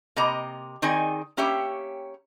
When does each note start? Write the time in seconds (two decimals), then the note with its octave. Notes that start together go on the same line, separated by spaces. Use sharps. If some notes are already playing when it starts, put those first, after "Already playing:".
0.16 C3 A#3 D#5 A#5
0.82 D#3 C4 D#4 G#4 D5 G#5
1.37 A#3 C#4 G4 C#5 E5